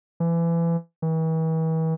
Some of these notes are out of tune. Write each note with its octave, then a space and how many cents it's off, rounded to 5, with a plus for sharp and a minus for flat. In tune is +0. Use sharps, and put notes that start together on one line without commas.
E3 +30
E3 -40